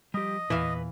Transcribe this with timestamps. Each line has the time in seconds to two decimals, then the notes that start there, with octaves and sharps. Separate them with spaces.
0.14 F3 G3 G4 D#5
0.50 E2 A#2 E3 B4 E5 F5